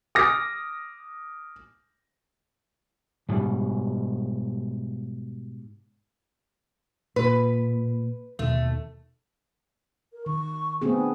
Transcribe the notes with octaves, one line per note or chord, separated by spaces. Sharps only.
D6 D#6 F6 A#6
G#2 B2 G3
A#2 B4
D#2 B2 D#3 A3
A#4
D#3 C#6
A3 B3 C4 G#4
D4